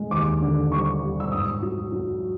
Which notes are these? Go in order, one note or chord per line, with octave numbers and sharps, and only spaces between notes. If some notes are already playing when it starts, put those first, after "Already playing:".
Already playing: G#3
D#2 D6
D3
G3 C#6
G3
E6
G#2 D#6
F#3
F#3